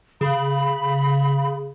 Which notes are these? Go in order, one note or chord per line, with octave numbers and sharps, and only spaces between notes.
C#3 B5